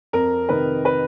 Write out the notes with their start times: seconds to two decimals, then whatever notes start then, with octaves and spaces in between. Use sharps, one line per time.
0.13 F2 A#4
0.48 C3 D#3 B4
0.85 B4